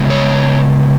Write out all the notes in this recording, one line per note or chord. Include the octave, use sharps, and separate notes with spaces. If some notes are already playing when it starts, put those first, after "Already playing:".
Already playing: C#3 G#3 B3 E4
C#5